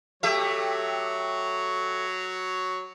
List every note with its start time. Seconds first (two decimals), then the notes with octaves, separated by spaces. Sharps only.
0.23 F#3 A3 G4 C#5 E5